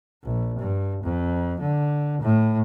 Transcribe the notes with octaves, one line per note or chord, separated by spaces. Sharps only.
A#1
G2
F2
D3
A2